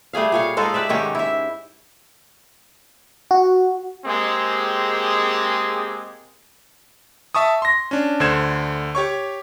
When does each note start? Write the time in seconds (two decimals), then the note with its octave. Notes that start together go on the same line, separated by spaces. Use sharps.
0.13 G3 A3 G#4 F5
0.32 A#2 C#5 F5
0.57 G#3 D#4 F4 A4
0.74 G4 B4 D5 E5
0.89 G#2 D#3 C#4 G4
1.15 E4 E5
3.31 F#4
4.06 G#3 A#3 C4 G4 G#4
7.35 E5 A5 C#6 D#6
7.62 C6 A#6
7.91 C#4 D4
8.20 D2 D3 C5 G#6 E7
8.95 G4 C#5 C#6